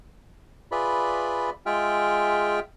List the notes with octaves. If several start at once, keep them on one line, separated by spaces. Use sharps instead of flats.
F4 G#4 B4 D5 E5 B5
G#3 F4 G#4 E5 G5 F6